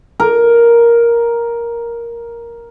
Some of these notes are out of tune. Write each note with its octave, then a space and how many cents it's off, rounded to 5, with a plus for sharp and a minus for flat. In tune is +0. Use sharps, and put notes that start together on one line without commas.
A#4 +5